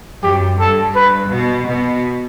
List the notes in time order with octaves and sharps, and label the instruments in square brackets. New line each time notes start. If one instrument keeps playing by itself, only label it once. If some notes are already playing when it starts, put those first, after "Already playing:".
[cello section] F#2 [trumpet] G4
[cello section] G2 [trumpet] A4
[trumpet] B4
[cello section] B2
B2